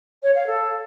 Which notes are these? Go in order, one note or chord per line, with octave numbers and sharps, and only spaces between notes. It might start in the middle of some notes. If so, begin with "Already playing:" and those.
C#5
F5
A4